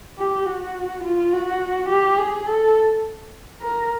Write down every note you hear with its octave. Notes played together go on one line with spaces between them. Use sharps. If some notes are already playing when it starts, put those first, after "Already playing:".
G4
F#4
F4
F#4
G4
G#4
A4
A#4